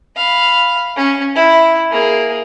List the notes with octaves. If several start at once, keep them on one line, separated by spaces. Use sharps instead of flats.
F5 B5
C#4
E4
A#3 G#4